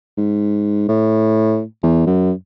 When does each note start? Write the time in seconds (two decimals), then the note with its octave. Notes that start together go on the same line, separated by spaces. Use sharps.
0.17 G#2
0.88 A2
1.83 E2
2.06 F#2